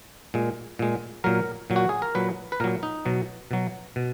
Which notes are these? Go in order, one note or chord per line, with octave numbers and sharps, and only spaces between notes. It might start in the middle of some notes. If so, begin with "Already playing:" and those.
A#2 G#3
A#2 G#3
A#2 F#3 A#4
A#2 F#3
F#4
G#4
A#4
A#2 F#3 B4
B4
A#2 F#3 A#4
D#4
B2 F#3
B2 F#3
B2